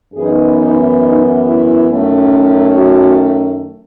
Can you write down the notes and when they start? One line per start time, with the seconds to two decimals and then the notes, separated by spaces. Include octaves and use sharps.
0.14 F#2 E3 B3 D#4 G#4
0.57 D#4
1.01 D#4
1.44 E4
1.88 F#2 D#3 A3 C#4
2.75 F#4